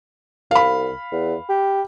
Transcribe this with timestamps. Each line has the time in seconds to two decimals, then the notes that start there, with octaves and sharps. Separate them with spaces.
0.51 C2 F5 B5
1.12 E2
1.49 G4